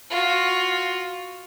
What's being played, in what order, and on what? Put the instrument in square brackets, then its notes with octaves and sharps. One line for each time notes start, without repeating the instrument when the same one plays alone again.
[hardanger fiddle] F4 F#4